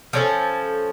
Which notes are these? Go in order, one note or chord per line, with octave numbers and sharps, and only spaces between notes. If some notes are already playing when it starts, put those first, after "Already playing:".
F3 C#4 A4